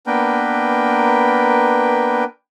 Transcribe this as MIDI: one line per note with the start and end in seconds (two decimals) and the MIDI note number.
0.07 2.24 58
0.07 2.24 59
0.07 2.24 62
0.07 2.24 70
0.07 2.24 71
0.07 2.24 79